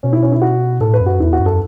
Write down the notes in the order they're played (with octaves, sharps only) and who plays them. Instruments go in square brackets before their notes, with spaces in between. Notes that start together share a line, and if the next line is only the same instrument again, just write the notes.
[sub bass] B2 [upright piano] C#4
[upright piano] E4
C#4
E4
F#4
[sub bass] A2 [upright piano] A4
[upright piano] B4
[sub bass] F#2
[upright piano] F#4
[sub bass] E2 [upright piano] E4
[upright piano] F#4
[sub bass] F#2
[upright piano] A4